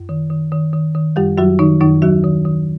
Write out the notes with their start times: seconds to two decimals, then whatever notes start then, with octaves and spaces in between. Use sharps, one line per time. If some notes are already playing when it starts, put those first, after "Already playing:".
Already playing: F#2
0.09 D#3
0.30 D#3
0.52 D#3
0.73 D#3
0.95 D#3
1.16 F#2 G3 G4
1.38 F#2 F#3 F#4
1.59 D#3 D#4
1.80 F#2 D#3 D#4
2.02 D#2 F#3 F#4
2.24 D#3
2.45 D#3